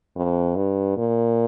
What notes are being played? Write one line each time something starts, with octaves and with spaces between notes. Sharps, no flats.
F2
G2
A#2